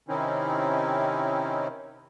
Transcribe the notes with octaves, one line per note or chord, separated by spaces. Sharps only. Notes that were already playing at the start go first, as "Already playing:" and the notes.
C3 D#3 C4 C#4 D#4 E4